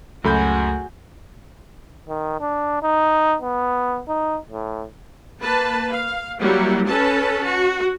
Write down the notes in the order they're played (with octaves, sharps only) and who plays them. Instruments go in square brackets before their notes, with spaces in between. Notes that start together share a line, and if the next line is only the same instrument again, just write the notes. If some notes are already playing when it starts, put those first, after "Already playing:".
[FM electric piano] C#2 A3 [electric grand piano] F#2 B5 G6 [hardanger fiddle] F#4 G#4
[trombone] D#3
D4
D#4
B3
D#4
A2
[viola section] A#3 B4 A5
F5
F#3 G3 A#3 E4
C#4 A4 B4 A5
F#4